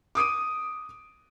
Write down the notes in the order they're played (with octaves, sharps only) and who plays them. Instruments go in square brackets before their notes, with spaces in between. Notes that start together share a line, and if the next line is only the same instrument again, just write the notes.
[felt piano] D6 D#6 D7 D#7